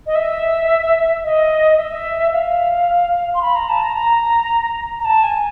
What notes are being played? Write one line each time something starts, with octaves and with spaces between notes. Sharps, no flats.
D#5
E5
D#5
D#5
E5
F5
C6
B5
A#5
A5
A#5
A#5
A#5
A5
G#5